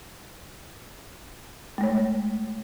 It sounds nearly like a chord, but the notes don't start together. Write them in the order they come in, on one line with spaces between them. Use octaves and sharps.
G#3 A3 C#5